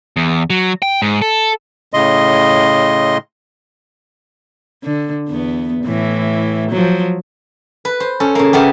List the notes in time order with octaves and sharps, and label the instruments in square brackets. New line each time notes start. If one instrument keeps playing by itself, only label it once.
[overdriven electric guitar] E2
F#3
G5
G#2
A4
[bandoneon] A2 C#3 D#5 C6
[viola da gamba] D3
E2 B3
A2 E3
F3 F#3
[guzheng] B4
C5
C#4 A4
C#3 A#3
C#3 A3 B3 G4